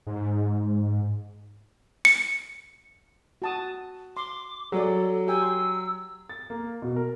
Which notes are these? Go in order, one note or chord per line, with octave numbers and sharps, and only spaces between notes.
G#2
C#7
F#4 A5 D#6
C6 D6
F#3 G#4 A4 D5
G4 G5 G#5 E6
C6
A6
A#3
B2
A#4